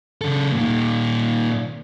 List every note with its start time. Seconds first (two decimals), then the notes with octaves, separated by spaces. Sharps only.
0.21 C#3 A4
0.52 A#2 D#3